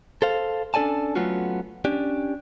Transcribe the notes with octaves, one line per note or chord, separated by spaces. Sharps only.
A4 C5 F5
C#4 D4 A4 D5 G#5 A5
F#3 A3 B3 C#4 F4 F#4
C#4 D4 G4